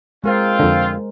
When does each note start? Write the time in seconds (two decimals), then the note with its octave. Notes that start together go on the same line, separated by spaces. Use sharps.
0.24 G#3 C4 F4 A#4 C5
0.59 F2 D3